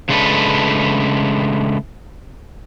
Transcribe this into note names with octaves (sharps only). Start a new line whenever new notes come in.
C#3 G#3 A3 D4 A4 B4